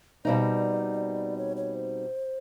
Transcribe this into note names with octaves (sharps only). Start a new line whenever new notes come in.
B2 G3 C4 D#4 D5
C#5
C#5
C5